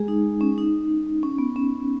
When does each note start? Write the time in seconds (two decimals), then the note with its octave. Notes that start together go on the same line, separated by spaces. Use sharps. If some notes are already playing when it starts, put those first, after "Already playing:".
Already playing: G#3 G#4
0.08 D#4
0.41 C#4
0.58 D#4
1.23 C#4
1.38 B3
1.56 C#4